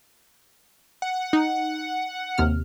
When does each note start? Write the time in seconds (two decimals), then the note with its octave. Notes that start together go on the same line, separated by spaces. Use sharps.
1.02 F#5
1.33 D#4
2.38 D#2 C3 F6